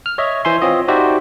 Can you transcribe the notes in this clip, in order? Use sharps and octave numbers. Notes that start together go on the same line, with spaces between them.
F6
C#5 D#5 E5
E3 C5 E5 G#5 C6
C4 F4 C#5 D#5
D#4 F#4 G4 C5 D5 E5